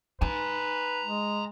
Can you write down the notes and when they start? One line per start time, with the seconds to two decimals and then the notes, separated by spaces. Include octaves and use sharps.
0.21 D#4 B4 G#5 A#5
1.04 G#3